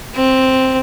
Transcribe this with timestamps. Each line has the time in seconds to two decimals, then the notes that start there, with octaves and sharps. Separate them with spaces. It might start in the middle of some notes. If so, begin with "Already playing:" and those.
0.15 C4